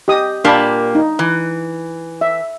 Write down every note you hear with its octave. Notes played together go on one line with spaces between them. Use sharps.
G4 D#5 D#6
A#2 A#3 D4 G4 A5 B5
D#4
E3
E5